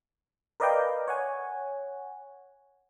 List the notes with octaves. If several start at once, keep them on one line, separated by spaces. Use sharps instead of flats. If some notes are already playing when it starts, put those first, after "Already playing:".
A#4 B4 D5 D#5 F5 G5
C#5 F#5 G#5